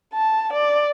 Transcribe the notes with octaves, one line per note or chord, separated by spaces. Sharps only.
A5
D5